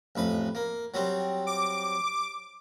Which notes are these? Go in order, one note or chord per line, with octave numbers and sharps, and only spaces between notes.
A1 F2 B4
A#3
F#3 G3 C4
D6